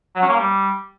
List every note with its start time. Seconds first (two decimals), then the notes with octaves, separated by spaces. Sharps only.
0.16 F#3
0.23 C#4
0.29 A#3
0.36 G3